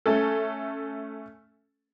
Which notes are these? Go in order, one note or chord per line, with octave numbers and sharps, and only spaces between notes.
A3 C#4 A4